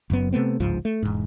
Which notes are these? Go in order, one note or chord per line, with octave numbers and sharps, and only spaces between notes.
F#1 F#2 F#3 B3
C3 A3 B3 C4
G1 C#2 G#2 F3
A3
E1 G#2